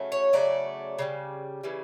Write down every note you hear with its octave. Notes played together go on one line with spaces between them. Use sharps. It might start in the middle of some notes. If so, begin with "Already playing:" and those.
Already playing: C#3 F#3 A3
C#5
C#3 F#3 A3 D5
C#3 E3 G3
C#3 E3 G3